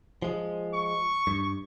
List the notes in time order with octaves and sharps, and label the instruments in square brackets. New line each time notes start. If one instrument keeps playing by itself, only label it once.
[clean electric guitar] F3 G#3
[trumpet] C#6
[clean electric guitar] G2